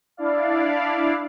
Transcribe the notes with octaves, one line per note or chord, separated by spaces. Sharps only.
D4 E4 D5 F5